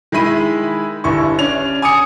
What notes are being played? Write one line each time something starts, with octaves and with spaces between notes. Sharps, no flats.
D#3 G#3 E4 B5 D#7
G1 G2 E4 C#6
C#4 D4 F7
G#5 D6 D#6 C#7